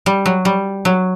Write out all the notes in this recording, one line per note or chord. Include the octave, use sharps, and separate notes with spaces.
G3
F#3
G3
F#3